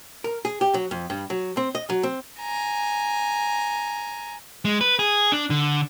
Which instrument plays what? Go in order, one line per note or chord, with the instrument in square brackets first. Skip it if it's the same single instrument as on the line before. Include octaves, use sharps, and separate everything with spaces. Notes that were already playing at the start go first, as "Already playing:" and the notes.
[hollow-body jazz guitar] A#4
G#4
G4
F#3
F2
G2
F#3
C4
D#5
F#3
C4
[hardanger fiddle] G#5 A#5
[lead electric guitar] G#3
B4
G#4
D4
D3